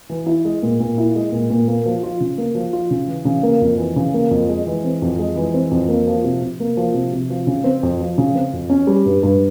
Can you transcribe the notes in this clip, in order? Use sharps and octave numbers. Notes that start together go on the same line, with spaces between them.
E3
E4
G#3
A#2
A#2
E4
G#3
A#2
A#2
A#3
F3
F4
C#3
A#3
F3
F4
C#3
E3
C#3
A#3
F2
E3
C#3
A#3
F2
G#3
E3
C4
F2
G#3
E3
C4
F2
A#3
F3
C3
C3
A#3
F3
C3
C3
F3
C#3
C4
F2
F3
C#3
C4
F2
C#4
G3
G2
G2